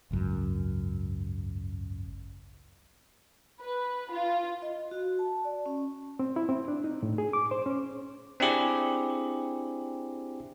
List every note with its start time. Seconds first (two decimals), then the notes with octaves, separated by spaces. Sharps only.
0.11 G#1 C#2 F#2
3.60 B4
4.11 F4
4.62 D#5
4.91 F#4
5.19 A5
5.45 D5
5.66 C#4
6.19 C4
6.36 E4
6.49 C4
6.68 D4
6.84 D#4
7.03 A2
7.18 G#4
7.33 D6
7.51 C5
7.66 C#4
8.40 C4 D4 E4 G4 G#4